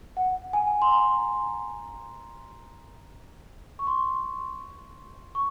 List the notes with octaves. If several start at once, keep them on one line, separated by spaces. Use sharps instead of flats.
F#5
G#5
C6
A#5
C#6
C6
C#6